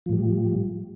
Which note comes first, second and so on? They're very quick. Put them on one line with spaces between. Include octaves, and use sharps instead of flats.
F3 A2 G3